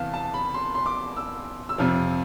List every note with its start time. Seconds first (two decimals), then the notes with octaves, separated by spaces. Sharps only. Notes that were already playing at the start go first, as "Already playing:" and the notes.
Already playing: E2 C3 E3 B3 F5 A5
0.14 A5
0.34 B5
0.54 C6
0.75 C6
0.86 D6
1.16 E6
1.69 E6
1.78 F2 C3 F3 F6